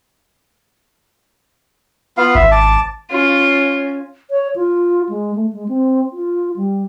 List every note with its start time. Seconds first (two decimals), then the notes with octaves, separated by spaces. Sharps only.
2.17 B3 F4 F5
2.35 G#1 E5
2.51 A5 D6
3.11 C#4 F4
4.31 C#5
4.56 F4
5.09 G#3
5.36 A3
5.53 G#3
5.69 C4
6.13 F4
6.56 G3